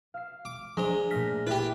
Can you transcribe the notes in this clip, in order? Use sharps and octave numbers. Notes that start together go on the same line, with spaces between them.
F5 E6 C7
D6
F3 G#3 D4 C5
A#2 A3 F6 A#6 B6
E4 G4 G#4 B4 E5